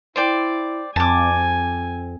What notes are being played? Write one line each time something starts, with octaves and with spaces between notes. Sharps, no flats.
E4 C5 D5 G5
F2 C4 G#5 A5 D6
C4